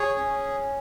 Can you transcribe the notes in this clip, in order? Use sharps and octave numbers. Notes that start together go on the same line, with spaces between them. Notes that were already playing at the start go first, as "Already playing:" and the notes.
Already playing: G#4 C#5
C#4